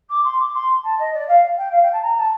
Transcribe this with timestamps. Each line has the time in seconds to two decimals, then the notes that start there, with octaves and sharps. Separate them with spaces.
0.09 D6
0.24 C6
0.39 D6
0.54 C6
0.83 A5
0.98 D#5
1.13 D5
1.28 F5
1.57 G5
1.72 F5
1.82 G5
1.92 A5
2.02 A#5
2.16 A5